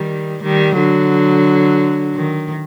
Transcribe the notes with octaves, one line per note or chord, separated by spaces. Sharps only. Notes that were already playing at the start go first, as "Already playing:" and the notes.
Already playing: D#3 G3
D#3 G3
D3 F#3
D#3